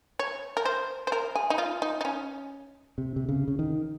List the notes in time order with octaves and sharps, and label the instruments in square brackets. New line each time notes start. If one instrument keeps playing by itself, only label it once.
[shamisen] C#5
A#4
C5
C5
A#4
G#4
D#4
F4
D#4
D#4
C#4
[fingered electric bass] C3
C3
C#3
C#3
D#3